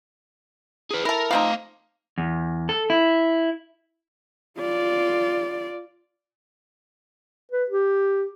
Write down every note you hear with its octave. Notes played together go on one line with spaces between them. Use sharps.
G#4 B4
E4 A4 A#4
F3 A3 C4 D#4 F5
E2
A4
E4
F4 D5
B4
G4